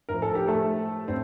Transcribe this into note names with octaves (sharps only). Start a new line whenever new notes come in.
A2 F3 A#4
A4
G4
A3 A4
A2 C4 C5